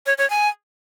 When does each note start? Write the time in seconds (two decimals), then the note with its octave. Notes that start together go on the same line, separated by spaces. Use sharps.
0.06 C#5
0.18 C#5
0.30 G#5